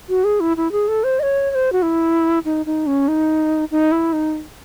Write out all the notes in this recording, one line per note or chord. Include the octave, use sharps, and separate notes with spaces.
F#4
G#4
E4
E4
G#4
A4
C5
D#5
C#5
C#5
C5
F#4
E4
D#4
D#4
C#4
D#4
D#4
E4
D#4